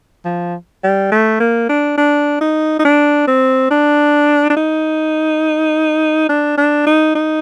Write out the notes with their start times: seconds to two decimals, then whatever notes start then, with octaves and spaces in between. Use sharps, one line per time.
0.25 F3
0.83 G3
1.11 A3
1.40 A#3
1.69 D4
1.98 D4
2.41 D#4
2.79 D#4
2.85 D4
3.27 C4
3.71 D4
4.50 D4
4.56 D#4
6.29 D4
6.57 D4
6.86 D#4
7.15 D#4